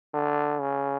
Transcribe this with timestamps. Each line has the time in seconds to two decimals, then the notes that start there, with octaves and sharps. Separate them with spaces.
0.14 D3
0.60 C#3